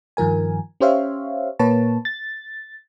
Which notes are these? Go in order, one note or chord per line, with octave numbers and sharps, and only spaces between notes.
G2 D#3 F3 A#4 G#5
C#4 G4 C5 C#5 E5 F5
A#2 A#3 B4 C#5 A5
A6